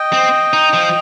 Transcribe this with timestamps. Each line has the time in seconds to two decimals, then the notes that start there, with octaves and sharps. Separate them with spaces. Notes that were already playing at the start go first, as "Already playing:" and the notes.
Already playing: D#5 G5
0.13 C4
0.53 D#4
0.73 F3